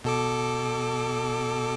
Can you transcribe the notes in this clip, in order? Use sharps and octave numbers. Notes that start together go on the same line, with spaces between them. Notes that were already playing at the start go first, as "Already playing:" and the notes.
B2 A4 D6